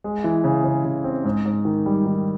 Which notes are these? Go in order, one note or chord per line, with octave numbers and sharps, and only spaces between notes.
G#3
E3
C#3
C#3
C#3
C4
G#2
G#2
D#3
G3
D#3